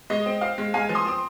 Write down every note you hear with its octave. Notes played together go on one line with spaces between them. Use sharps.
G#3 D#5
C4
C4 F5
G#3
G#3 F5 G#5
F3
C6 D#6
C4 D#6